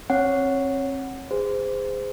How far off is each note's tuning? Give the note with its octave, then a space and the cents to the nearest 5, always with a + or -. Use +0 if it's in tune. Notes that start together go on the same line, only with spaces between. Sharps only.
C4 +35 C#5 +5 F#5 +0
G#4 -20 C5 -25